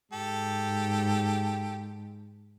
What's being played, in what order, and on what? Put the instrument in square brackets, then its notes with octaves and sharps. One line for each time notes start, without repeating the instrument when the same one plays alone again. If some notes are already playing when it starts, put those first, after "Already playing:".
[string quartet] G#2 [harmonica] G4 A4